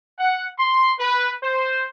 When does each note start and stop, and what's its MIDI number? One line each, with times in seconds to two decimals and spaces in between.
0.18 0.45 78
0.57 0.93 84
0.99 1.31 71
1.42 1.84 72